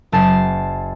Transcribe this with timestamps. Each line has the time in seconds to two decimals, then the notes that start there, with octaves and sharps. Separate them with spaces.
0.12 F#1 A5 C7